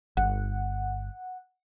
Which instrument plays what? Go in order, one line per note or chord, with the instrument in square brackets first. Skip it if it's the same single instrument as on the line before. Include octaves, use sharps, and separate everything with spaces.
[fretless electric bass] G1 [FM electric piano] F#5